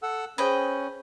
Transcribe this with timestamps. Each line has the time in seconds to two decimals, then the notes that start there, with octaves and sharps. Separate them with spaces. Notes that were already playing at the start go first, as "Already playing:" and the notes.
0.03 A4 F#5 E6
0.38 C#4 G#4 B4 C5 D#5 G5 D#6